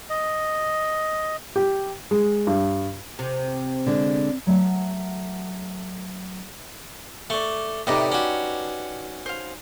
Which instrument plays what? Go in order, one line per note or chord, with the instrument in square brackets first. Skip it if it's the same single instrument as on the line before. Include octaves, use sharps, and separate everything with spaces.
[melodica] D#5
[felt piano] G4
G#3
G2
[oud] C3
[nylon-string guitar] D3 G#3
F#3 A3 E5 F#5
[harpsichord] A3 [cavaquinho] D5 C#6
[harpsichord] A2 C3 [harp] D#4 B4 D5 [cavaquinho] G4 D#5 D6
[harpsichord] C#4 F#4 [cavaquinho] G4
[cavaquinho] C5 F5